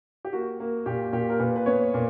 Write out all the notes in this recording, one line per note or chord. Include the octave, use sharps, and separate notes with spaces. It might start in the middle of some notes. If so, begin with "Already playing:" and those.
G4
A#3 F#4
A#3
A#2 G4
A#2 G4
A#4
A#2 B4
B4
B3 C#5
A#2